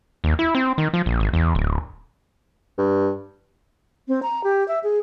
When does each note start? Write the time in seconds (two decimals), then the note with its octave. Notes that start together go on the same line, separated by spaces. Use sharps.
0.24 D#2
0.39 E4
0.55 C4
0.78 D#3
0.94 F3
1.06 A#1
1.20 G#1
1.33 E2
1.55 D1
2.78 G2
4.08 C4
4.23 A#5
4.44 G4
4.68 E5
4.83 G#4